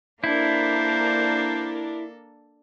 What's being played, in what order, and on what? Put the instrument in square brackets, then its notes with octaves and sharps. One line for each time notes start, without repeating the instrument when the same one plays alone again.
[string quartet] A#3 A4 [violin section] D4 A#4 [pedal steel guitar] E4 [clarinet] C5